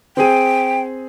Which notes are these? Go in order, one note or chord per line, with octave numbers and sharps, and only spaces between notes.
C4 G#4 G5 D#7